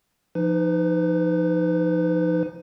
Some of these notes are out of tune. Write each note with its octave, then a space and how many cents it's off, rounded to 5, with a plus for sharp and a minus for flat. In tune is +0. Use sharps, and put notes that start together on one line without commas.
F3 -15 D#4 -5 B4 +30